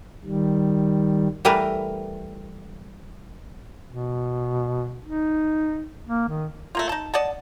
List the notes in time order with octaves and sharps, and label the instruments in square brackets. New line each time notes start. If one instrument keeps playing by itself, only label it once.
[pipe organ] D#3 G3
[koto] E3 G3 A3 E4 A#4 B4
[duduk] B2
D#4
A#3
D#3
[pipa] A3 A#3 F4
D#4 A5
D5 D#5 F#5 A5